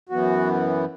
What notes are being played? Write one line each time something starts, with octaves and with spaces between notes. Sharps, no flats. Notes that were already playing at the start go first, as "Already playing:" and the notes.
F#2 E3 B3 F#4